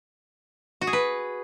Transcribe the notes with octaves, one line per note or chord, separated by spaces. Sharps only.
F#4
G#4
B4